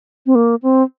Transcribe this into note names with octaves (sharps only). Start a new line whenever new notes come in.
C4
A#3
C4